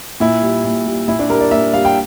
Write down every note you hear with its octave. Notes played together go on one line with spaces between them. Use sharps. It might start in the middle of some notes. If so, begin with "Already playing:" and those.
A#2 E4
G3
A#2
G3
A#2 E4
D4
G3 A#4
D5
A#2 E5
G3 F5
G5